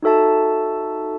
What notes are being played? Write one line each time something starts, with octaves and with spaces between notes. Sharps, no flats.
D#4 F#4 A4 E5 A5